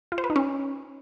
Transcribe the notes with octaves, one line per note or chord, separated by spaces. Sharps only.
F4
C5
B4
D#4
C#4